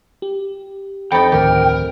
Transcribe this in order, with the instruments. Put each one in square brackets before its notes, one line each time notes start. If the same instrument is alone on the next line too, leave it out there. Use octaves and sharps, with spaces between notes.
[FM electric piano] G4
[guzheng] F2 D#4 [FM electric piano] C5 A6 C#7 [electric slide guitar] G5 [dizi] B5
[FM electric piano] D2 A2 D#3 [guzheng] G4 [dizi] A#4